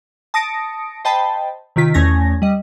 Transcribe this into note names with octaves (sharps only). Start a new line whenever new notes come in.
A5 D#6 A#6 C#7 D7
C5 D#5 G5 A5 B5
C3 D#3 F4 B6
E2 A3 C#4 G#5 G#6 A#6
G3 D#5